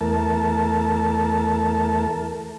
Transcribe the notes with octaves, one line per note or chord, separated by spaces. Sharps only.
E2 A3 A#4 A5